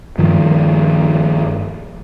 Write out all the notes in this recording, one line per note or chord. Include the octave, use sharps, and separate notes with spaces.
G2 D#3 F3